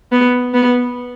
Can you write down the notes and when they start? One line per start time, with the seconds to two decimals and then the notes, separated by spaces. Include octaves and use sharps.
0.12 B3
0.54 B3